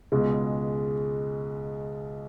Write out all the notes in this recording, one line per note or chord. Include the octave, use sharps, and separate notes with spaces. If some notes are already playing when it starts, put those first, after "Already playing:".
C#2 B2 G#3